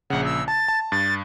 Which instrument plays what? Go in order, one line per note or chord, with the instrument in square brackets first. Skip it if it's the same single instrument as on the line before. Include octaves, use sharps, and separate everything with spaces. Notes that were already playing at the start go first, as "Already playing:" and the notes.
[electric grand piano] A#1 C#3 [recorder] F#5
[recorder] E6
[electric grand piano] A5 [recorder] A6
[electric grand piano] A5
[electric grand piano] G2 [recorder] A6